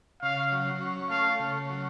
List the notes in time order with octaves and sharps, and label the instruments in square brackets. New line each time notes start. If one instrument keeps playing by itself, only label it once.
[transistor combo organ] C#3 [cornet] F5
[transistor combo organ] F#3
C#4
[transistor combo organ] A3 [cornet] F5
[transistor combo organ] C#3
F#3